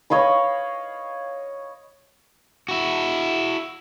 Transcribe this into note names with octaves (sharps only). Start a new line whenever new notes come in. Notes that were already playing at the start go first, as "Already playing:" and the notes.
C#5 D#5 F5 B5
E4 F#4